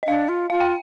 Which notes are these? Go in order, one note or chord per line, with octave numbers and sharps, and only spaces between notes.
D#5
D4 F5
F4
F4 F5
G5